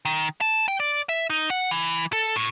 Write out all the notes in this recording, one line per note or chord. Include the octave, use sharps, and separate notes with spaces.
D#3
A5
G5
D5
E5
D#4
F#5
E3
A4
A2